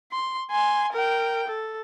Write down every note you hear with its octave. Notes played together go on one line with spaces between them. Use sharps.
C6
G#5 C6
A#4 G5
A4